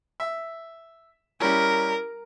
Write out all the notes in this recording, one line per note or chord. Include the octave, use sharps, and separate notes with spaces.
E5
G3 C#4 E4 A#4